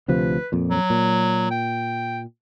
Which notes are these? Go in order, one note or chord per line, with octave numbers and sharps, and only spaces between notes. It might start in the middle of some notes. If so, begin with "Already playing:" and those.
D2 C3 F3 B4
F2 A#2
F#3
A#2
G5